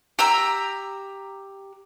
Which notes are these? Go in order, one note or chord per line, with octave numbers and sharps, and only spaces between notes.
G4 A#5 E6